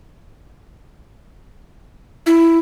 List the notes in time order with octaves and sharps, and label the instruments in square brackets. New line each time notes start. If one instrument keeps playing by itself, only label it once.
[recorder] E4